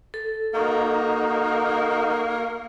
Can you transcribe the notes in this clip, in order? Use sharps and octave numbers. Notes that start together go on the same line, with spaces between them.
A4
A#3 D#4 F#4